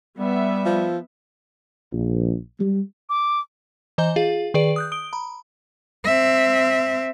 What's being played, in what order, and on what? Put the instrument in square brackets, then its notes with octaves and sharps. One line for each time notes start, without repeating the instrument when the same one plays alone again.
[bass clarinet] G3 [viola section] B3 E5
[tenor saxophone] F3
[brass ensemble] A#1
G3
[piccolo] D6
[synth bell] E3 C5 D#5 A#5 G6 G7
F4 G#4 F5
D#3 G#4 B4 D5 D7
D#6 F#6 G6
D#6 D7 G7
A#5 B5
[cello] C4 E5